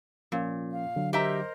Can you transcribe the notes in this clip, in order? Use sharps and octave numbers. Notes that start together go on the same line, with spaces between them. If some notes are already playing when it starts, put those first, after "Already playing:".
A#2 F3 A#3 C#4
F5
D3 F#3
G4 A#4 C5 D#5 E5 A#5